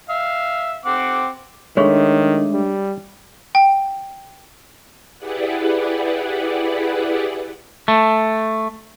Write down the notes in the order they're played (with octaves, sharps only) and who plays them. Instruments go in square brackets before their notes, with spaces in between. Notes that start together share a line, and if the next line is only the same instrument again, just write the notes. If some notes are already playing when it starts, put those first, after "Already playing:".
[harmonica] E5 F5
C4 F#5 D6
[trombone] D#3 [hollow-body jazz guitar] G#3 A3 [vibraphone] D4 [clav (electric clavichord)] C#5
[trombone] G3
[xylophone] G5
[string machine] E4 G4 G#4 B4 D5 F#5
[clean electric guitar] A3